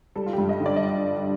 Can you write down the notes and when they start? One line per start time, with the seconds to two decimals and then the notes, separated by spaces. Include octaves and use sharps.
0.16 G3 A4
0.26 F4
0.33 G2 G4
0.49 D#5
0.60 D3
0.66 D5
0.76 D#5